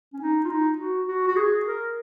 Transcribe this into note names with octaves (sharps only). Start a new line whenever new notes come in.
C#4
D#4
F4
D#4
F#4
F#4
F#4
G#4
A#4